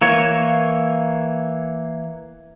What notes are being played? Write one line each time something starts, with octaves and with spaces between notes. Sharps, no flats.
E3 A#3 C#5